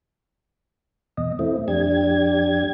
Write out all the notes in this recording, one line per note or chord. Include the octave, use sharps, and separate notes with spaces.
E2 B2 D#5
A3 C4 E4
F2 D4 G4 G#6